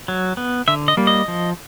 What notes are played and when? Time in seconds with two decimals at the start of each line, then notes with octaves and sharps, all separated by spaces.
0.08 F#3
0.37 B3
0.68 D3 E5
0.88 D#5
0.97 G3 A#3
1.07 D#5
1.28 F3